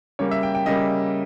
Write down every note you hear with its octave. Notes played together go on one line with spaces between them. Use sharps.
C#3 G3 A#3 C#5
E5
G5
G5
C#3 G3 A#3 D#5